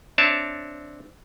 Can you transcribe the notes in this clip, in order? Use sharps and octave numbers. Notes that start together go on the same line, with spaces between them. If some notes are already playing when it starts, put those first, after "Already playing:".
C4 D4 C#5 E5 A5